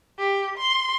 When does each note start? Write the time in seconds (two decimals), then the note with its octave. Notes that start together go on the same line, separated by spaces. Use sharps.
0.19 G4
0.58 C6